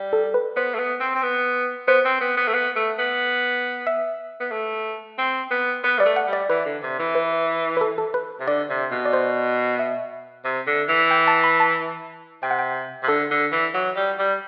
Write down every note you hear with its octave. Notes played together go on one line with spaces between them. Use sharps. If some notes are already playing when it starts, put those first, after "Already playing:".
Already playing: G3
A4
B4
B3 C5
A3
B3
C4
C4
B3
B3 C5
C4
B3
B3
A3
B3
A3
B3
E5
B3
A3
C4
B3
B3 B4
G3 D5
A3
F#5
G3
D5
E3 B4
D3
C3
E3
B4
B4
A4
A4
B4
C3
D3 D5
C3
B2
D5
C5
E5
C3
D3
E3
G5
A5
B5
A5
C3 G5
F#5
G5
C3
D3 A4
D3
E3
F#3
G3
G3